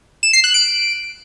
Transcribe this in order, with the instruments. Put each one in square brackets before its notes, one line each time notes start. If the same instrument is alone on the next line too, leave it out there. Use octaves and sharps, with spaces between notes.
[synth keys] E7
C7
F#6
D7